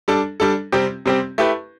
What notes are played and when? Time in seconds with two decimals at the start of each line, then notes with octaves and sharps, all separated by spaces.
0.08 G3 D4 A4
0.40 G3 D4 A4
0.72 C3 G3 C4 G4
1.06 C3 G3 C4 G4
1.38 A3 E4 G4 B4